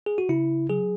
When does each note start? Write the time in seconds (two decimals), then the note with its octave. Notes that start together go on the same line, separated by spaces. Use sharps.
0.06 G#4
0.18 F#4
0.29 C#3 E4
0.70 F#3 G#4